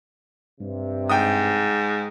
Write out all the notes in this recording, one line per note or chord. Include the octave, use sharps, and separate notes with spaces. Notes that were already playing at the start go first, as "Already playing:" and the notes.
G2 C3
G#2 G5 D#6